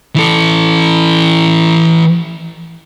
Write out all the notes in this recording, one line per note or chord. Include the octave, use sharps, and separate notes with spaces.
E3 A4